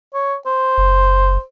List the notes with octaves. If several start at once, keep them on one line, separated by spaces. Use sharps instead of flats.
C#5
C5
F#1